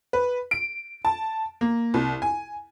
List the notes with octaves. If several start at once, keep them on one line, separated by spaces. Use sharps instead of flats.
B4
D7
A5
A#3
C2
G#5